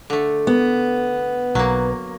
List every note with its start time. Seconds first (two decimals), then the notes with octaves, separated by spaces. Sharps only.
0.10 D3 A3
0.47 B3
1.55 B1 F#3 A#3